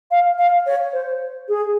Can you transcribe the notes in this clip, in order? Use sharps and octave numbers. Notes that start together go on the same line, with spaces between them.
F5
F5
C#5
C5
G#4